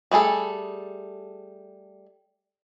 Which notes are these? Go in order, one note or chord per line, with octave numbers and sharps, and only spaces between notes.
G3 A3 G#4 A4